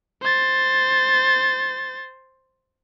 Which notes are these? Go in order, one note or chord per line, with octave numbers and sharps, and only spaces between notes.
C5 A6